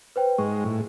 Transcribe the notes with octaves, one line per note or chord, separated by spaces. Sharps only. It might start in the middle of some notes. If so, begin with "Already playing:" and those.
B4 C5 G5
G#2 G#3 C#6
A2